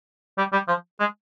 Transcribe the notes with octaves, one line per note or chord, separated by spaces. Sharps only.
G3
G3
F3
G#3